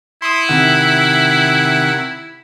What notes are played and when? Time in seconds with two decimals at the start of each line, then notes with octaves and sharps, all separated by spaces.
0.22 E4 C6 D#6
0.49 C3 D#3 F#5